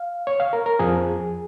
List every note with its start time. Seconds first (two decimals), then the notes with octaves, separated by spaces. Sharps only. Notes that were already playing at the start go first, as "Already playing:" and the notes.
Already playing: F5
0.27 C#5
0.40 F5
0.53 A#4
0.66 A#4
0.79 F2 F3 G#4